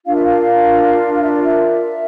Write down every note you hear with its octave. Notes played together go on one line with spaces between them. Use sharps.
D4 F4 A#4 F5
E5
F5
F5
E5
D5
E5